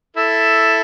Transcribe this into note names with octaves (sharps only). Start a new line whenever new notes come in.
E4 A4